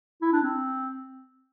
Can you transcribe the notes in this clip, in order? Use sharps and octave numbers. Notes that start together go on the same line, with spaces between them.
E4
D4
C4